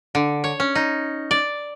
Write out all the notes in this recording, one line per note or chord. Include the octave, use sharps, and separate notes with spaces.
D3
C#5
C#4
D#4
D5